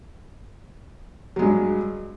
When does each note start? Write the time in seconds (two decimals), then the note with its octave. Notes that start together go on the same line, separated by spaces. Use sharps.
1.36 F#3
1.39 G#3
1.42 G2